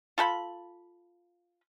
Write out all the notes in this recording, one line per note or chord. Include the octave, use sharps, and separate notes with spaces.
F4 A4 G5 B5